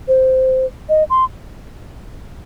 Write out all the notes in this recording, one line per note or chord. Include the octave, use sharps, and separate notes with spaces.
C5
D#5
C6